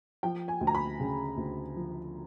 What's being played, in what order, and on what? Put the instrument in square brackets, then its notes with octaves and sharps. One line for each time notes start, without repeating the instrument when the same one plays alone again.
[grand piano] F3 G5
G#5
D2
A#5
B5
C#3
D2
F3